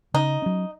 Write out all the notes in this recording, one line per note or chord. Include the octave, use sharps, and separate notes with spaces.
C#3 D#4
F#3 C#4